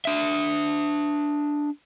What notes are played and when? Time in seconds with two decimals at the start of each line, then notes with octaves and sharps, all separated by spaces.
0.05 D4 E5